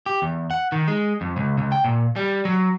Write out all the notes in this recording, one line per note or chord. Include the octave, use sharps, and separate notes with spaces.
G4
E2
F#5
D#3
G#3
F2
C#2
C#2
G5
A#2
G3
F#3